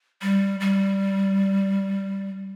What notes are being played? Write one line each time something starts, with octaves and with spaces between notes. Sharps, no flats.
G3
G3